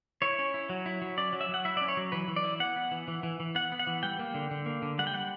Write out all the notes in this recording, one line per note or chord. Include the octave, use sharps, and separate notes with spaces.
E4 C#5
C#4
E4
F#3
E4
F#3
C#4 D5
F#3
E5
F#3 F#5
E4 E5
D5
C#4
C#5
F#3
E3 B4
E3
D5
E4
B3 F#5
B3
E3
E3
E3
E3
B3 F#5
B3
F#5
E3
G3 G5
A#3
D3
D3
A#3
D3
G3 F#5
G5
G3 F#5